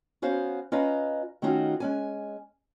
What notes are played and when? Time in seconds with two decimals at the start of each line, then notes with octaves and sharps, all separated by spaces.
0.22 B3 C#4 F#4 C5 F5
0.72 C#4 F4 B4 D#5 F5 A#5
1.42 D#3 A3 C#4 D#4 F4 F#4
1.80 G#3 C#4 G#5